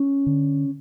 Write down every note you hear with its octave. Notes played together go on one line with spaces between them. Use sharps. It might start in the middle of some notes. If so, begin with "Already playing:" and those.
Already playing: C#4
D3